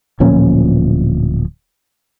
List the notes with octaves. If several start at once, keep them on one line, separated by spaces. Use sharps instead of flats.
D1 A#2 F3 C#4